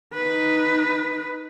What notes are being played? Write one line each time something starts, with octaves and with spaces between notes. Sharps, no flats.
D#4 B4